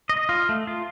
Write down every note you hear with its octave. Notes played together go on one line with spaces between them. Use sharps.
D#5
F4
A3
F4